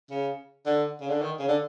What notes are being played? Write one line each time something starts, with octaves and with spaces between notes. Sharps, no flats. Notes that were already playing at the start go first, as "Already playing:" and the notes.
C#3
D3
C#3
D3
D#3
C#3
D3